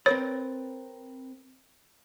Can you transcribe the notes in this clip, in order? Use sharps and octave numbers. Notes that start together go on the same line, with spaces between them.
C4 A#4 B4 C#5